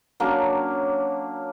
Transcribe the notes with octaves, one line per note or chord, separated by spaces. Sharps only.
F#3 A#3 C#4 D4